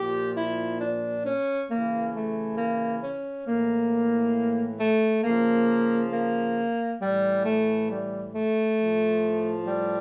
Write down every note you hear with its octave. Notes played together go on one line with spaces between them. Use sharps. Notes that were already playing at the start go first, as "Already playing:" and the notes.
Already playing: A#2 F3 G4
E4
D4
C#4
C#3 E3 A#3
A3
A#3
C#4
A2 E3 A#3
A3
C#3 F3 A#3
A#3
A2 E3 G3
A3
G3
A3
A2 F3
G3